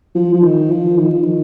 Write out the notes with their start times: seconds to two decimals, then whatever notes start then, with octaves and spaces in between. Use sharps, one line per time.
0.15 F3
0.33 F3
0.43 D#3
0.71 F3
0.98 D#3
1.10 F3
1.23 D#3